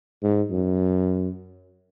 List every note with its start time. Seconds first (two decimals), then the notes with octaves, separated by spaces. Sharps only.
0.23 G#2
0.51 F#2